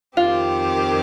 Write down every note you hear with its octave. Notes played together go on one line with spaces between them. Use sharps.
F2 D#3 C4 F4 G4